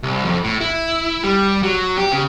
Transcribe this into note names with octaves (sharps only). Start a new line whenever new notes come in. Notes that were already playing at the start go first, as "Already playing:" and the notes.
C2
F2
A2
E4
G3
F#3
G4
C#3